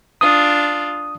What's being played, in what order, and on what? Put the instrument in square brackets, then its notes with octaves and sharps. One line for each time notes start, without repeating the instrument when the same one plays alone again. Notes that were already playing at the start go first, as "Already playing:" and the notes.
[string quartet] D4 F4 [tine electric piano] D#6